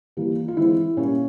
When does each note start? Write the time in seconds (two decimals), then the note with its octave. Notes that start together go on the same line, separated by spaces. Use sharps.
0.17 E3 G3 A#3
0.48 F4
0.57 E3 G#3 C4 E4
0.97 A#2 G3 A#3 C#4